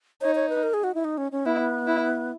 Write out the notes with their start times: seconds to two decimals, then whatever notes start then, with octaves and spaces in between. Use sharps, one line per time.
0.21 D#4 C#5
0.35 C#5
0.49 B4
0.63 A#4
0.74 G#4
0.84 F#4
0.95 E4
1.04 D#4
1.18 C#4
1.32 C#4
1.46 B3 E4
1.87 E4